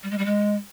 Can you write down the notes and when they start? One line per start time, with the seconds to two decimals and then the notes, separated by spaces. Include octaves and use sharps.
0.03 G3
0.10 G#3
0.18 G3
0.25 G#3